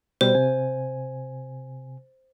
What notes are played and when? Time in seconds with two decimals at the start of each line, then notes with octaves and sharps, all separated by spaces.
0.21 B2 G3 C5
0.35 C3 G#5